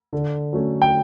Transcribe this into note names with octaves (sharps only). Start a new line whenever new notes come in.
D3
F#3 A3 C#4
G5